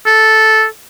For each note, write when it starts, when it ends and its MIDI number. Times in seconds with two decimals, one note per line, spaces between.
0.06 0.65 69